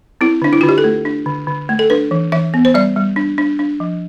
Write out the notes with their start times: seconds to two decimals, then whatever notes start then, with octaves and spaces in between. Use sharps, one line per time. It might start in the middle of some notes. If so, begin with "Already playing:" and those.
0.21 C4 E4
0.42 D3 D4
0.53 E4
0.61 D3 F4
0.69 G4
0.78 A4
0.84 A3
1.05 D4
1.26 D3
1.47 D3
1.69 A3
1.79 A4
1.90 D4 B4
2.11 E3
2.32 E3 E5
2.54 B3
2.65 C5
2.74 G3 D5
2.96 G3
3.16 D4
3.38 D4
3.59 D4
3.80 F3